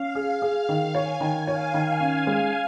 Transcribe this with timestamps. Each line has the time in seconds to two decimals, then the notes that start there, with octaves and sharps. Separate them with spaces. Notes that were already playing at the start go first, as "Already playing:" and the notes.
Already playing: C#4 F5
0.15 G#4
0.42 G#4
0.69 D#3
0.95 C#5 G#5
1.21 D#3
1.47 C#5 F5
1.74 D#3
2.00 C#4
2.27 G#3